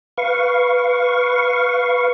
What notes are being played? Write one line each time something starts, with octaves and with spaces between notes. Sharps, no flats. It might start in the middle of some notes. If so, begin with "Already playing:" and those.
B4 F5 C#6